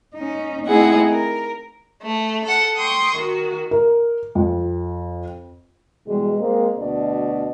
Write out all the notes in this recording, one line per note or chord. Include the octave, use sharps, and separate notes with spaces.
C#4 D#4
A3 C4 D#4 E4 G#4 F#5
A#4
A3
A4 F#5
G5 C6 C#6 D#6
D#3 F#4
A#4
F2
B2 E3 G3 G#3
G#3 A#3 C4
D2 B2 D4 D5